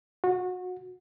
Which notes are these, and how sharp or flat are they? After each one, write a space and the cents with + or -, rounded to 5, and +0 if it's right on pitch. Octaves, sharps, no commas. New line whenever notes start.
F#4 -25